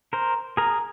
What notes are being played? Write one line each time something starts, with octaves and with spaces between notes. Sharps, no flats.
A#4 C5
G#4 A#4